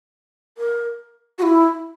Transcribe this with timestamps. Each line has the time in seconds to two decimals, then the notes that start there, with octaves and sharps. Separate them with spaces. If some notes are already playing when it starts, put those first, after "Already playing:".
0.58 A#4
1.39 F#4
1.43 E4